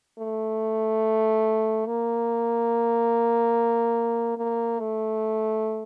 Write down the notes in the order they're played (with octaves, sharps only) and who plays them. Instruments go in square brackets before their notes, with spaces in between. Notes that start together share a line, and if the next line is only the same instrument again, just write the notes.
[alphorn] A3
A#3
A#3
A3